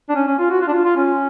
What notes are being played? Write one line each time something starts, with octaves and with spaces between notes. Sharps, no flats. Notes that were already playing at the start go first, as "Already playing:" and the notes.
D4
C#4
C#4
F4
F#4
F4
D4
F4
F4
C#4